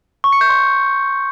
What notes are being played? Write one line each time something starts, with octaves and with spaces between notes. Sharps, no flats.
C#6
C#7
G6
C6